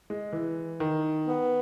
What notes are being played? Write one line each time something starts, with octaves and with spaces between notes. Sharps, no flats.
G#3
E3
D#3
B3